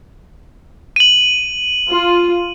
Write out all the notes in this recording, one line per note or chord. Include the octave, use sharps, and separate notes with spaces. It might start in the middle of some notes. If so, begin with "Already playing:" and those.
D#7 F#7
F4